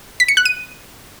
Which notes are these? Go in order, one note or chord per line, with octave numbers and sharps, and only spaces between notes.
B6
C#7
F#6
D#7